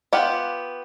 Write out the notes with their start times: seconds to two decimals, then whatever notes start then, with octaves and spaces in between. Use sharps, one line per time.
0.13 B3 F4 G4 F#5